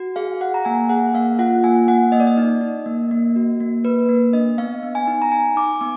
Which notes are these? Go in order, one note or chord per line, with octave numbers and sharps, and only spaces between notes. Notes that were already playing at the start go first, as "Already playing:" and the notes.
Already playing: F#4
G#4 F5
G#4 F#5
A#5
A#3 G#5
G#4 F#5
A#3 F5
F4 F#5
A#3 G#5
A#3 F#5
A#3 D#5
D5
D#5
D#4
D#4
A#3
A#3
F#4
A#3
A#3 B4
A#3
D4 D#5
B3 F5
B3
G#5
D#4
A#5
D#4 G#5
D#4 D6
B3 D6